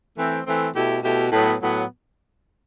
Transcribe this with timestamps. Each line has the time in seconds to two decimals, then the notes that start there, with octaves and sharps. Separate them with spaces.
0.17 E3 A3 C4
0.45 E3 A3 C4
0.74 B2 A3 E4 G4
1.03 B2 A3 E4 G4
1.32 A2 F#3 B3
1.61 A2 F#3 B3